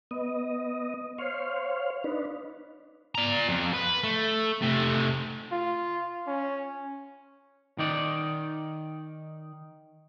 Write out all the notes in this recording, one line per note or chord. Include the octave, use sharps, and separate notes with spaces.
B3 D#5
C5 C#5 F5
D4 D#4 B4
D5 A#5
F2
B4
A3
C3 A3
F4
C#4
D#3 D#4 D5